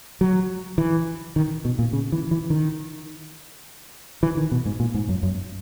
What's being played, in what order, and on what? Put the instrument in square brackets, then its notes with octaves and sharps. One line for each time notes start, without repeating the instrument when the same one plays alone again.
[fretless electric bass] F#3
E3
D#3
B2
A#2
C#3
E3
E3
D#3
E3
D#3
B2
G#2
A#2
G#2
F#2
F#2